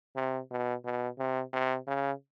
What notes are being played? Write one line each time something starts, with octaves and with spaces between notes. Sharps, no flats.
C3
B2
B2
C3
C3
C#3